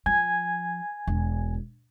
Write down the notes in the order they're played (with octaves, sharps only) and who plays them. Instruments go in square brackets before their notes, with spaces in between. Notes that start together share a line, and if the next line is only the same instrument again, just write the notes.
[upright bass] F3 [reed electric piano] G#5 G#6
[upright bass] E1